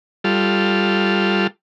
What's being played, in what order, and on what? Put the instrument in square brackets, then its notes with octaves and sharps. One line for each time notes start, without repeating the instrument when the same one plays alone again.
[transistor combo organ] G3 F4 A4